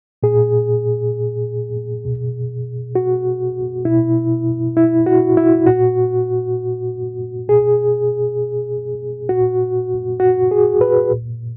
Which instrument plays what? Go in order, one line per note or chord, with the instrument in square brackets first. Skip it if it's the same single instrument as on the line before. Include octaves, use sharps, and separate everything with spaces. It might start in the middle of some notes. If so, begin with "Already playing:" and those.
[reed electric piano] A#2 G#4
B2
F#4
B2 E4
E4
F#4
E4
A#2 F#4
B2 G#4
A#2 F#4
F#4
G#4
B4
A#2